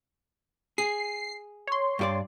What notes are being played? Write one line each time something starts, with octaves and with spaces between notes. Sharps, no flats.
G#4 C7
C#5 C6
G2 G4 D5